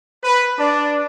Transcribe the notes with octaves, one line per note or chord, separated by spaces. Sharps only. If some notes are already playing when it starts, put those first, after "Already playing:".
B4
D4